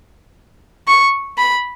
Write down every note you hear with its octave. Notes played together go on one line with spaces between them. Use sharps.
C#6
B5